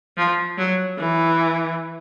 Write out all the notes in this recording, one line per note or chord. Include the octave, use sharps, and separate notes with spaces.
F3
F#3
E3